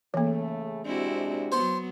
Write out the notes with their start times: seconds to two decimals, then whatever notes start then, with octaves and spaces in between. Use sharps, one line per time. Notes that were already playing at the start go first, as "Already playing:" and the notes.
0.14 C#3 E3 A3 A#3
0.85 C3 G#3 C4 D4 E4 F#4
1.52 F#3 B3 C5 C6